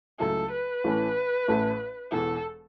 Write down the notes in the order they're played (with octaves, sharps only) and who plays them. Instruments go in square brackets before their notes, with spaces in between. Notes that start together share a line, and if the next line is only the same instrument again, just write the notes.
[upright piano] C#2 C#3 F#3 A3 E4 [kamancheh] A4
[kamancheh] B4
[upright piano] A1 A2 E3 A3 C#4
A1 A2 A3 C#4 E4
[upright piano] E1 E2 E3 [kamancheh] A4